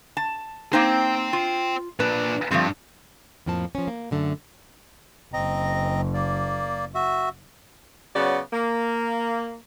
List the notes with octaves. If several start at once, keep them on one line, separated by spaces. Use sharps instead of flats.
A5
A#3 C4 D#4 C5 G5
F4
A#2 D4 B4
G2 F3 A3 C4
F2 A2 F3 A#3 A5
F3 C#4
A#3
F#2 D3 A3
F#1 C4 D#5 A#5
A#3 D5
F#4 E5
C#3 F#3 B3 D5
A#3